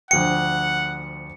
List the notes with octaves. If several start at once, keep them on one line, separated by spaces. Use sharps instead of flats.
D2 F3 F#5 G5 C#7